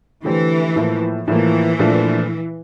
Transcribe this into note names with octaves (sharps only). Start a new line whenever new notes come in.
D3 E3 A3 E4 G4 C5
A2 F3 A#3
A2 E3 F3 A#3
A#2 F3 A3 D4